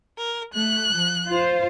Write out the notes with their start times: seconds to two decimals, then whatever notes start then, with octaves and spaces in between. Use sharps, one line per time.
0.18 A#4
0.53 A3 F#6
0.94 F3
1.29 F4 C5